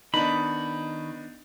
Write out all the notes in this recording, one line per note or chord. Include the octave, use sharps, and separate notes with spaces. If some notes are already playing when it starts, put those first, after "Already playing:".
D#3 B3 D4 D#4 B5